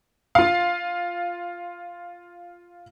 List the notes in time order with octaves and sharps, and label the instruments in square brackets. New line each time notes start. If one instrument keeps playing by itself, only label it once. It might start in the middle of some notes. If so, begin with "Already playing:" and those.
[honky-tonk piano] F4 F5